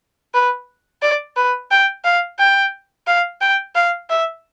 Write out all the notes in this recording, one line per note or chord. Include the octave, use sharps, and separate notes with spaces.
B4
D5
B4
G5
F5
G5
F5
G5
F5
E5